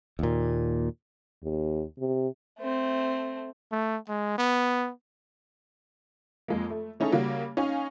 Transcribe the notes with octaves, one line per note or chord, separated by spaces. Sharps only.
D#2 A#2
D#2
C3
A3 C4
A3
G#3
B3
F2 G#3 A#3
A3
A3 C#4 D#4 E4 G#4 A4
C#3 G3 A#3 F#4
C#4 D#4 F5 G#5